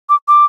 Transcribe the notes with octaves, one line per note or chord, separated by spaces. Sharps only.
D6
D6